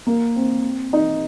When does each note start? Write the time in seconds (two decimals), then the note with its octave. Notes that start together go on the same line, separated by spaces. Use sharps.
0.07 A#3
0.36 C4
0.93 D#4